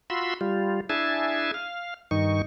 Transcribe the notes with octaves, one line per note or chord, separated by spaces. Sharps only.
F4 F#4 B5 C6 E6
G3 F4
D4 E4 G#4 E5 G#5 A5
F5
G2 D#3 D#4 C#6